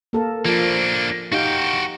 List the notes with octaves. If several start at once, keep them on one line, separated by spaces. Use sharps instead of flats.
A#3 A4 A#4
F3 A#3 D4
D#4 F#4 G4 F5 G5